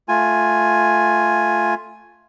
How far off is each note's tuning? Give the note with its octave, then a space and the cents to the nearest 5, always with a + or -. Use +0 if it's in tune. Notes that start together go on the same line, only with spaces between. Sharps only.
A3 +0 F4 +5 G#5 +0